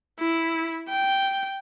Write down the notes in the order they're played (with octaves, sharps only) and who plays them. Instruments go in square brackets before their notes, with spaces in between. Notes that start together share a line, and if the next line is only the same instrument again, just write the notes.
[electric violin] E4
G5